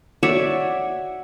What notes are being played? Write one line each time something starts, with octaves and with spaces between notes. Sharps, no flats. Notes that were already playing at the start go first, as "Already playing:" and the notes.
F#4 C#5 D5 E5